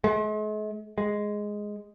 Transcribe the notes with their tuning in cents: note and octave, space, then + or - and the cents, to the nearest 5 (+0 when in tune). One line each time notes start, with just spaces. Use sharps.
G#3 +45
G#3 +0